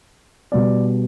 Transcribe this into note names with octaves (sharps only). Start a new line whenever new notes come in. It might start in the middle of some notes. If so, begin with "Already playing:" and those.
B2 G3 B3 D5